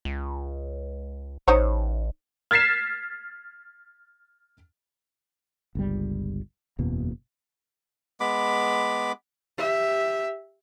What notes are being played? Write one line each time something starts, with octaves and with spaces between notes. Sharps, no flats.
C#2
A1 D#4 C5 C#5
F6 G#6 A6 B6 C7 E7
G1 C#2 G3
F#1 E2 B2 A#3
G#3 B3 B5 D6
G4 E5